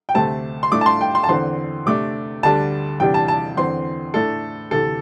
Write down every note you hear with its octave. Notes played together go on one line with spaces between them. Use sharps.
G5
D2 C3 A3 C4 A5
C6
A2 A3 D4 D6
A5
C6
G5
C6
A5
E2 D3 C4 C6
C3 A3 D4 D6
D2 D3 G3 D4 A5
E2 C3 G3 D4 G5
A5
A5
E2 D3 C4 C6
A2 A3 D4 A4
D2 C3 E3 A4